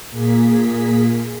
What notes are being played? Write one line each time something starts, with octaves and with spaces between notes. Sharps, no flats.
A#2 A#3 G#4 B6